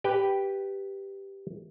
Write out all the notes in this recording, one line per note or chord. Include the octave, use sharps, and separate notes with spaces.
G4 B4 G5